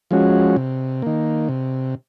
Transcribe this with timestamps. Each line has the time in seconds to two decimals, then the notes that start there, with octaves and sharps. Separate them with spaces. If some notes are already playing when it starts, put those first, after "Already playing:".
0.11 F3 G#3 C#4 F#4
0.56 C3
1.02 D#3 A#3
1.49 C3